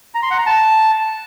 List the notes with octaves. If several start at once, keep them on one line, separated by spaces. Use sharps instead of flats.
A#5
C6
F#5
A#5
A5